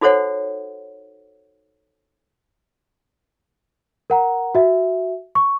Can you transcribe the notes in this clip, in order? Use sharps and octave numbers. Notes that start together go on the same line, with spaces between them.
D#4 F#4 A4 C5 C#5 F#5
A#4 F#5 A#5
F#4 E5
C#6